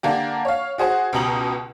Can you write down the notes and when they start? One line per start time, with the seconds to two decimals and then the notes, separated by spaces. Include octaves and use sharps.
0.03 D3 A#3 D4 G4
0.45 C#5 F5
0.78 F#4 G#4 C5 F#5
1.13 C#2 B2 G4 A#5 F#7